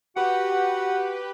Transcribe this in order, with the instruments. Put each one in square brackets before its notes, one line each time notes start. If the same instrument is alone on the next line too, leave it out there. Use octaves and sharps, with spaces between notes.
[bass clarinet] F#4 [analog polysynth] G4 B4 [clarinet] F#5